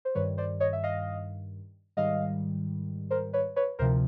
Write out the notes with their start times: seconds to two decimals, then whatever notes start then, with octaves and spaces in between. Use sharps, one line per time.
0.05 C5
0.15 G2 D#3 G3 B4 C#5
0.38 C5 D5
0.60 C#5 D#5
0.73 E5
0.83 D#5 F5
1.97 G#2 D#3 G3 D#5 F5
3.10 A#4 C5
3.33 B4 C#5
3.56 B4 C#5
3.79 D2 C3 F3 A#4 C5